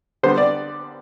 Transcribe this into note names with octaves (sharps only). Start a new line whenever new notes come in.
D3 G3 B3 C5
D5